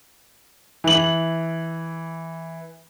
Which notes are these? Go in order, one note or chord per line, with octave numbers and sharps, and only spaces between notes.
E3 F#7